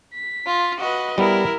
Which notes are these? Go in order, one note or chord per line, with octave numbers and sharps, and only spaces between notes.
B6
F4
F#4 B4 D#5
G3 B3 E4 A#4